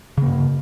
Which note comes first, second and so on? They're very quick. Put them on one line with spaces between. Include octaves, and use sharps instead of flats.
C#3 A#3 G2